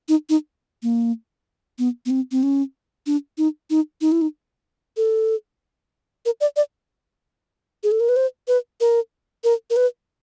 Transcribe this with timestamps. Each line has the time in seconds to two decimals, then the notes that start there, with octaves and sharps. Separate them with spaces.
0.08 D#4
0.29 D#4
0.83 A#3
1.79 B3
2.06 B3
2.10 C4
2.31 C4
2.43 C#4
3.06 D4
3.38 D#4
3.70 D#4
4.01 D#4
4.12 E4
4.21 D#4
4.97 A4
6.25 A#4
6.41 D5
6.56 D5
7.83 G#4
7.91 A4
8.00 A#4
8.09 B4
8.16 C5
8.48 B4
8.80 A#4
9.44 A#4
9.70 A#4
9.76 B4